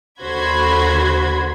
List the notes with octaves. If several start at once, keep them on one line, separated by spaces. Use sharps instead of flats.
D#2 D3 F#4 C5 B5 G#6